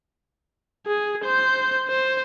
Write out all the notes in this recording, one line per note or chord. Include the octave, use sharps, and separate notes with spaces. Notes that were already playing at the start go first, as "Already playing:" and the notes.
G#4
C5 G6
C5